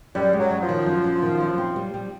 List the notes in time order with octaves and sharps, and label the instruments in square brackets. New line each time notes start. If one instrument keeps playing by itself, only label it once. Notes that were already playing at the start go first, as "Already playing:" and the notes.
[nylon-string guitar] F#2 [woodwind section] G3
[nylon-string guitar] G#3
[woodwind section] F#3
[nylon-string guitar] F#2
[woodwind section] F3
[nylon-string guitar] D#3
F#2
F#2
D#3
F#2
C4
G3
G3